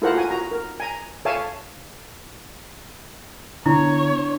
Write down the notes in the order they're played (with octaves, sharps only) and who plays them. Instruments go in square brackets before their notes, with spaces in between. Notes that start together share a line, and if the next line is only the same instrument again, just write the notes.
[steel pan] E4 F4 A4 A#4 C5 F#5
F#4 G#5
F#4 A#5
A#4
G#5 A#5
A4 C#5 E5 F5 G#5 A5
[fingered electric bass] D3 B3 [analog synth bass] D4 [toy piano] E4 [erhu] C#5